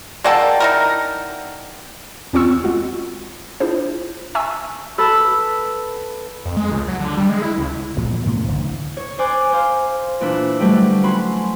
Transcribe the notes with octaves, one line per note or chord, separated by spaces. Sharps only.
G#3 A#3 A4 D5 F#5 G5
D#4 E4 A#4
E2 C4 C#4 F4 C#6 E6
G#3 F4 F#4
D4 E4 F4 G#4 C5
E5 G#5 A5 C#6 E6
A4 B4 E6
F2
G#3
C#2
F#3
D3
G3
G#3
E4
C#2
A#2 F3 F#3 G#3
A2 C#3 A3 A#3
F1 C2 D3 E3
C#5
C5 D5 G#5 D6 F#6
C5 F5
A#2 E3 D4 B4 E6
D3 F#3 G3 A3 G4 B4
C#4 F#4 B5 C6